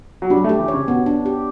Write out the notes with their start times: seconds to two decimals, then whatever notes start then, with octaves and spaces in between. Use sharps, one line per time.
0.22 F#3
0.30 G3 D4
0.44 A3
0.49 G4
0.59 E3
0.68 C#5
0.74 C#3
0.88 B2 B3
1.06 D4
1.26 G4